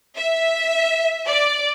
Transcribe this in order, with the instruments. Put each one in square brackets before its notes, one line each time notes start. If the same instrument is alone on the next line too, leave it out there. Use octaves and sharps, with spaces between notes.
[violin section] E5
D5